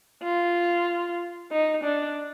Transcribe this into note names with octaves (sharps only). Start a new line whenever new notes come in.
F4
D#4
D4